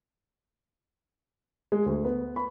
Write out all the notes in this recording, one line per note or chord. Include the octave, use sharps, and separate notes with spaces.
G#3
D2
B3
B5